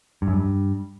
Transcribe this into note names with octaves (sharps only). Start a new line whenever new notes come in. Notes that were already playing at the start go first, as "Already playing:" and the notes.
G2
F#2
G2